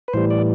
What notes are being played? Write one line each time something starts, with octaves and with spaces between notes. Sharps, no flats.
B4
A2 E3 G3 C5
D5